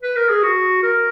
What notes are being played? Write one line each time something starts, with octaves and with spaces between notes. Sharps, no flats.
B4
A#4
G#4
F#4
A#4